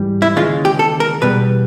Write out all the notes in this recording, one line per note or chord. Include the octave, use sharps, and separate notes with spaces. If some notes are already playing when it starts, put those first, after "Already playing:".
Already playing: G#2 E3 G3
E4
D#2 C#3 E3 G#3 F4
G4
A4
A#4
E2 B2 G3 B4